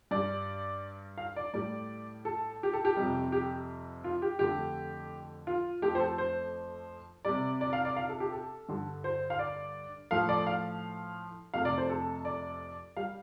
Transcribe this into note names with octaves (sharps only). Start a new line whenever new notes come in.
G2 G3 D5
F5
D5
A2 G3 D5
A4
G4
A4
G4
F2 C3 G3
G4
F4
G4
F2 D3 A3 G4
F4
F2 F3 A3 G4
C5
A4
C5
C3 G3 D5
D5
F5
D5
F5
A4
G4
A4
G2 D3 G3
C5
F5
D5
A2 F3 A3 F5
D5
F5
F2 C3 A3 F5
D5
C5
A4
D5
G3 F5